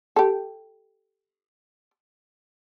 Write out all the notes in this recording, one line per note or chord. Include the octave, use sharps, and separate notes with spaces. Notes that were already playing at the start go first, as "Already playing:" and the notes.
G4 A4